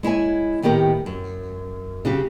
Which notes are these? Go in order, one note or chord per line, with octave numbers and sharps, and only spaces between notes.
G#3 E4 C#5 G#5
A2 D#3 B3 G4 A#4
F#2
C#3 F#4 G4